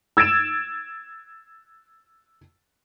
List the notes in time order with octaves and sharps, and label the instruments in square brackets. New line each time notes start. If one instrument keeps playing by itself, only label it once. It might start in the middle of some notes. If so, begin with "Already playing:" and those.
[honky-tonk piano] E6 G#6 A6 D7 E7